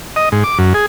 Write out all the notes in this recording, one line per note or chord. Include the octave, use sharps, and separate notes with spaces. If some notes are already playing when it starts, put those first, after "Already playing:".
D#5
G#2
D6
F#2
G#4